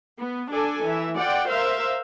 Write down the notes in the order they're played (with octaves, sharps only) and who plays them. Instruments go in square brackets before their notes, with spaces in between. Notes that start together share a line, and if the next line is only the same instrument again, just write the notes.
[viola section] B3
D4 A4 D5 G#5
E3 E5
F4 D5 F#5 G5
A#4 C5 E5 F5